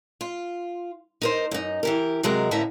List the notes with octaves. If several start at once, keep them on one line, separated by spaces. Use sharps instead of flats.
F4
D#4 A#4 C5
F#2 D#4
E3 G4 A#4
C3 F#3 G#3 F#4 A#4
D2 A2 A#3 C#4 E5 A#5